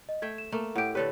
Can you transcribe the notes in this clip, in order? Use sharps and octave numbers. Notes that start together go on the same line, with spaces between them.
D#5
A3 E5 G5 G#6
E7
A3 A#3
A2 G4 F#5 D7
D3 G4 A4 B4 C#5